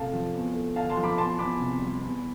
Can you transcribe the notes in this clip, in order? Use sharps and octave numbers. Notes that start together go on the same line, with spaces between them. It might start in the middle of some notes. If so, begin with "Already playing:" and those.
Already playing: F2 C3 A3 F5 A5
F3
E2
A3
D3 F5 A5
A5 C6
F3
B5 D6
E2 A5 C6
E2 B5 D6
C3
G3
E2